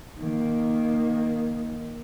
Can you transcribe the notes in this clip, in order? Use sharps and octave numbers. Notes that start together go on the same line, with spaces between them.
D#3 A#3